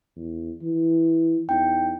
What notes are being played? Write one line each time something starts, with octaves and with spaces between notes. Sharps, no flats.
E2
E3
E2 D#4 G5